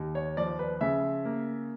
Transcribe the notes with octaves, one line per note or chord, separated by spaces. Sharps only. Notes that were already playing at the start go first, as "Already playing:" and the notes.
Already playing: D#2
C#5
F3 D5
B4
C#3 E5
A#3